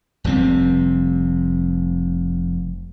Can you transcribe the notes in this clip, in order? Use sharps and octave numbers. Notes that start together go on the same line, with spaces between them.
F1 C3 G3 C4